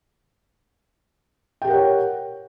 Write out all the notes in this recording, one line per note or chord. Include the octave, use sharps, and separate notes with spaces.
G4 A#4 C#5 F#5 G5